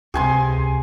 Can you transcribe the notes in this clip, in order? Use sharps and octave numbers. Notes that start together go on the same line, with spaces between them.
C#2 C3 G#4 G#5 C6